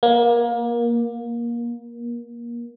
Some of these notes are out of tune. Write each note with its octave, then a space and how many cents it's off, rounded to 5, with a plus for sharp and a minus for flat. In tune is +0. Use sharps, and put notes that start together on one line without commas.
A#3 +20